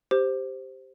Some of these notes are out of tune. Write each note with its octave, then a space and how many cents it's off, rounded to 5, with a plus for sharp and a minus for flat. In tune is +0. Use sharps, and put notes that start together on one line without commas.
G4 +0 C5 +0